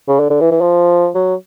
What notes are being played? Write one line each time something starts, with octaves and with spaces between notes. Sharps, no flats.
C#3
D3
D3
E3
E3
F3
F#3